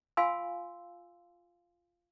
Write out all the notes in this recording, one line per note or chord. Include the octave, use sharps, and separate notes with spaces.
F4 F5 G#5 C6 E6